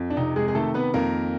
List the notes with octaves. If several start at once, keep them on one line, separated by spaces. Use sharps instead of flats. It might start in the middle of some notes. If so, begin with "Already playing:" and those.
Already playing: F2
D4
C3 D#4
G#3 G#4
G#4
D#3 A3 A4
B3 B4
F2 A#3 A#4